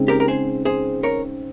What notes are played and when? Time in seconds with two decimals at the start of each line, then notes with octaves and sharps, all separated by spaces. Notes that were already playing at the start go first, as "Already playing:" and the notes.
Already playing: C#3 G#3 C4 D#4
0.08 G4 A#4
0.20 A#4
0.28 G#4 C5
0.65 G#4 C5
1.03 A#4 C#5